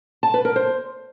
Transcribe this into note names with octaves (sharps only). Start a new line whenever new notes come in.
A5
B4
A#4
C5